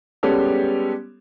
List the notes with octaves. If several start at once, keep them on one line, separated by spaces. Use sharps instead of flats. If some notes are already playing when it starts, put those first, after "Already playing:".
G3 G#3 B3 C#4 G4 A4